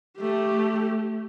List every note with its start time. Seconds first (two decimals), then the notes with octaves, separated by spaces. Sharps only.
0.18 A3 G4